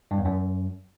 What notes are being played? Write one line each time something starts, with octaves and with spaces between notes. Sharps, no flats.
G2
E2
F#2